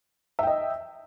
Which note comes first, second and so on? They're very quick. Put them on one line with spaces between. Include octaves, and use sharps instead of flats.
E5 G5 D#5